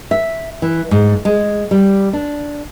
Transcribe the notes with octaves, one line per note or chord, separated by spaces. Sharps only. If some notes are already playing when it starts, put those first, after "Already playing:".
E5
E3
G#2
G#3
G3
D4